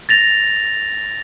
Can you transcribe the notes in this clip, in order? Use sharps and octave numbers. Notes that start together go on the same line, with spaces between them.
A6 A#6 F7